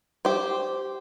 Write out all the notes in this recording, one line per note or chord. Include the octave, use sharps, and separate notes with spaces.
G4 C5